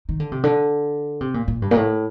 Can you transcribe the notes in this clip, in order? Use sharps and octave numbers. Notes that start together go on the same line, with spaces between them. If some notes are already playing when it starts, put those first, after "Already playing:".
D#3
D3
C3
D3
C3
A#2
A#2
G2
A#2
A2